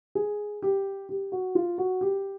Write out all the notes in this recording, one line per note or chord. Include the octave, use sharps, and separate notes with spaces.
G#4
G4
G4
F#4
F4
F#4
G4